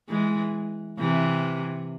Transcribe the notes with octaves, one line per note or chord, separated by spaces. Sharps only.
E3 G#3
C3 E3